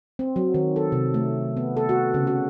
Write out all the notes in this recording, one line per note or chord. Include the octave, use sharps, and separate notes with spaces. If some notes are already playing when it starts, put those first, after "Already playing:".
C4
F#3
D#3
A4
C3
A3
B3
A4
F#4
C#3
F#4